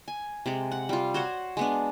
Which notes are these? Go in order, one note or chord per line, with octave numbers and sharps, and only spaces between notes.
G#5
C3 G#3
F#5
G3 F4
F#4 C5 C#5 F#5
G#3 B3 D4